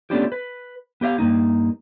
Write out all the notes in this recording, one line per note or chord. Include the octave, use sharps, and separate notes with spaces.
A3 B3 C#4 D4 F4 G4
B4
B3 G4 D#5 F5
G2 B2 A#3 D#4